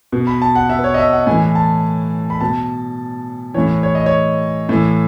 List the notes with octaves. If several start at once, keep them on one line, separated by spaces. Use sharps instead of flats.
B2
B5
A5
F#5
E5
B4
C#5
D#5
E5
F#5
A2 E3 G#5
A5
B5
B2 A5
A2 E3 C#5
C#5
D#5
C#5
A2 E3